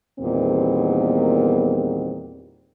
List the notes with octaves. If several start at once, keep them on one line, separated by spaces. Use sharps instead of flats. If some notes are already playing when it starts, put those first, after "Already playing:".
E2 A#2 D#3 G3 B3 C4